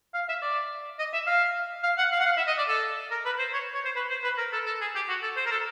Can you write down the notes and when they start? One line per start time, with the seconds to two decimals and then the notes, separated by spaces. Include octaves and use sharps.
0.14 F5
0.28 E5
0.42 D5
0.99 D#5
1.13 E5
1.26 F5
1.83 F5
1.98 F#5
2.12 F5
2.20 F#5
2.25 F5
2.37 E5
2.47 D#5
2.57 D5
2.68 A4
3.11 A#4
3.25 B4
3.38 C5
3.53 C#5
3.74 C#5
3.85 C5
3.96 B4
4.10 C5
4.24 B4
4.38 A#4
4.53 A4
4.66 A4
4.81 G#4
4.95 G4
5.09 F#4
5.22 A4
5.37 C5
5.46 A#4
5.51 A4